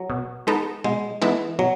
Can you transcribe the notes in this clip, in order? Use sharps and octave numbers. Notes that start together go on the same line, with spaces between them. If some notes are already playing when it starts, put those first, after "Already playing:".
Already playing: F#3
B2
G#3 B3 D#4 A4
B2 G#3
E3 G#3 B3 D#4 A4
B2 F#3